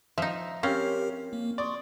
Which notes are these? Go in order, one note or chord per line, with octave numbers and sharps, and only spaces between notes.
F3 D#4 E5
C4 C#4 G4 A#4 F5
A#3
D5 C6 C#6 D#6